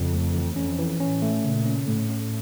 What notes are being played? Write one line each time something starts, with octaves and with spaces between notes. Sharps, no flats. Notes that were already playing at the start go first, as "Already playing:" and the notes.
Already playing: F2 C#3
A3
E3
F2 C#4
E3
A2 C#4
A3
A#2 C#3
C#4
A2 A3
C#4